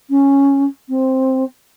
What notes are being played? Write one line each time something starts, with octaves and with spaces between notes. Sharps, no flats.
C#4
C4